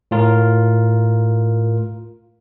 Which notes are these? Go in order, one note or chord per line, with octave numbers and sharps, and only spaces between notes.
A2 F4 A#4